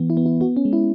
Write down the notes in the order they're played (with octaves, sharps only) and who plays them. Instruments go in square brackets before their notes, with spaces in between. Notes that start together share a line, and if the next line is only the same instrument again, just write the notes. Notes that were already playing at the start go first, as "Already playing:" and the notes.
Already playing: [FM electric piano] E3 B3
E4
B3
E4
B3 F#4
C#4
G#3
E4